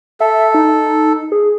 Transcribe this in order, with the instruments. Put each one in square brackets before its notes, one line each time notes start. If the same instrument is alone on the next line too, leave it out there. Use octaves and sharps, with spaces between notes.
[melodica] A4 [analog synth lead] E5
[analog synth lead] D#4
G#4